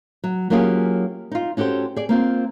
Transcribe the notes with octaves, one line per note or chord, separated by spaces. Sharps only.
F#3
F#3 A#3 C#4 F4 G4 G#4
D#4 F4
C#4 F#4 G4 A4 C5
G#4 D5
A#3 C4 F4